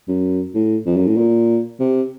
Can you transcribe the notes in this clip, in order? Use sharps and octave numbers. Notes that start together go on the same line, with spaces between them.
F#2
A2
F2
F#2
A2
A#2
C3